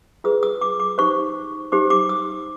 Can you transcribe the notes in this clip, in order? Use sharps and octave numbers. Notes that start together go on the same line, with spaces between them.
F4 G#4 B4 D#6
D#6
D6
D6
D#4 G4 C5 C#6
D#4 G4 C5 D6
D6
D#6